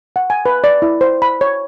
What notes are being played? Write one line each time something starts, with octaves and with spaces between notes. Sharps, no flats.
F#5
G#5
B4
D5
E4
C5
B5
C#5